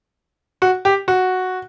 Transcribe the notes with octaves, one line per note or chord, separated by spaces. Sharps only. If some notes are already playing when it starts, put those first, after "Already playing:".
F#4
G4
F#4